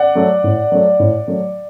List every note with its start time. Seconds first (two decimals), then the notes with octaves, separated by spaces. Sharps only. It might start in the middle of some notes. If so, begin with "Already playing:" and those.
Already playing: D5 F#5
0.15 F#3 A3
0.44 A2
0.72 F#3 A3
0.99 A2
1.28 F#3 A3